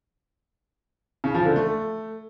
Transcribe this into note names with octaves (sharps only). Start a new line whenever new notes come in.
C#3
F3
D3
A3